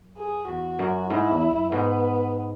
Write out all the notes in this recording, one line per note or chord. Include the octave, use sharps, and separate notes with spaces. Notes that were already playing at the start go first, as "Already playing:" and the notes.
Already playing: F#2
G#4
E2 F#4
F#2
G#2 E4
E2
F#2
G#2 B3